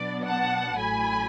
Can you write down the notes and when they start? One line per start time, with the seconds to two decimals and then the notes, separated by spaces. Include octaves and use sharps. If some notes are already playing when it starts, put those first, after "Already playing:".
Already playing: B2 F#3 B3 D4 D5
0.26 F#5 A5
0.78 A1 A2 F#3 A3 G#5 B5